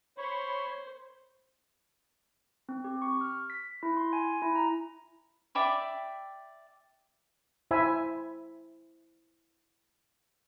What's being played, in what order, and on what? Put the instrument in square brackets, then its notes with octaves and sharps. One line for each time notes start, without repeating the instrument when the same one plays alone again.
[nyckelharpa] C5 [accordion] C#5 B5 C#6
[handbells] C4
G4
C#6
F6
B6
E4
C6
G#5
E4
A#5
[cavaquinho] D5 E5 G5 B5
[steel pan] E4 C5 E5 G#5 B5